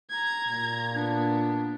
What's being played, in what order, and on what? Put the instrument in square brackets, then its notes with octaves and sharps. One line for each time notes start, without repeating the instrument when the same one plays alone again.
[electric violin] A#5 G#6
[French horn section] A#2
[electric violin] B3 [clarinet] D4